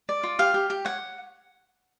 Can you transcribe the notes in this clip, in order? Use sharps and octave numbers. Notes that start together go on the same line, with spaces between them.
D5
F4
G4 F5
G4
G4
C#5 F#5